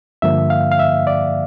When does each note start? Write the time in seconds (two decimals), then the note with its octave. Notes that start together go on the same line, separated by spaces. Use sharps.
0.22 G2 D3 F3 A#3 E5
0.50 F5
0.72 F5
0.79 E5
1.07 D5